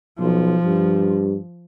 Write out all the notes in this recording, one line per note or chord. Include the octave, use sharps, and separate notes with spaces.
B1 F3
G2